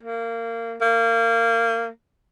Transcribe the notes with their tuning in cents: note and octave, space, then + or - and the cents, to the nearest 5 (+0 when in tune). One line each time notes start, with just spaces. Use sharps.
A#3 -25
A#3 -25